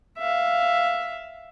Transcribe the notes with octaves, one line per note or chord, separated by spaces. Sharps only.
E5 F5